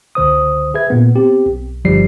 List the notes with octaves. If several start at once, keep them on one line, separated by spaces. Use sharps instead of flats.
C#2 D3 C5 D#6
G#4 B4 E5 G#6
A#2 A#3 B3
B3 C4 G4
B1
G1 F3 G3 C7